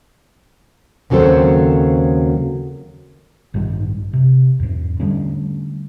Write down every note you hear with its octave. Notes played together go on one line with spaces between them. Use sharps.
D#2 C#3 F#3 C4 A4 C5
A1 G2 D#3 G#3
C3
E2 G#2
D3 G3 A3 C#4